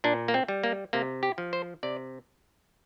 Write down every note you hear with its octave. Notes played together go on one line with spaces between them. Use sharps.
A#2 D4
A#3
C4
G3
A#3
C3 A#3
G4
F3
C5
C3 D5